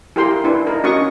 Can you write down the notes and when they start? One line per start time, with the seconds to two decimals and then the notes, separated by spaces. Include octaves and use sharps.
0.16 E4 G4 A#4 G5 C6
0.44 D4 E4 B4
0.67 D#4 A#4
0.83 C#4 F#4 D#5 C#6 D#6